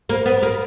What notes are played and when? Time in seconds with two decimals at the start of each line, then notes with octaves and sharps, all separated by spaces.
0.09 A#3
0.25 B3
0.43 A#3